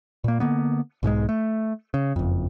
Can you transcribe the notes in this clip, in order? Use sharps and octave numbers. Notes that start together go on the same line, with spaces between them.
A#2 A#3
D3 A#3 B3
B1 G#2 D#3 G#3
A3
C#3
F#1 F2